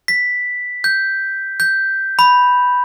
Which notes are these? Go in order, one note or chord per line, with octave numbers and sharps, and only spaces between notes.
B6
G6
G6
B5